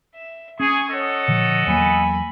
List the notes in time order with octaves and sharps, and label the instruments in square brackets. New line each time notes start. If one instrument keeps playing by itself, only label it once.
[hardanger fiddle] E5
[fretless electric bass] C#4 [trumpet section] G#4 [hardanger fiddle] C#6
[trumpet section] A4 D#5 F#5 [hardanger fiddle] C#5
[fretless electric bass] A#2 D3 F3
[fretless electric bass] E2 F#3 A#3 [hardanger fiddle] G#5 B5